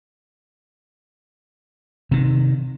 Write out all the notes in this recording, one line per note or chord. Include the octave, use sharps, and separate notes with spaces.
C3 D#3